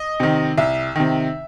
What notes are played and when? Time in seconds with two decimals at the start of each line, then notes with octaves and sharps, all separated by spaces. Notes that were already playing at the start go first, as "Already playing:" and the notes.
Already playing: D#5
0.20 C3 D#3
0.58 C2 E5
0.96 C3 D#3